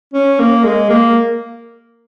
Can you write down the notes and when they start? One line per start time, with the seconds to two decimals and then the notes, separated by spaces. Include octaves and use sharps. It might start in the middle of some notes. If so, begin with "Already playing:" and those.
0.14 C#4
0.39 A#3
0.64 G#3
0.90 A#3